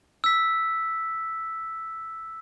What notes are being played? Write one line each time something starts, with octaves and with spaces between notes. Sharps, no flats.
E6 B6